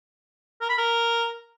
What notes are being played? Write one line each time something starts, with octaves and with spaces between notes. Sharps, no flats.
A#4
B5
A#4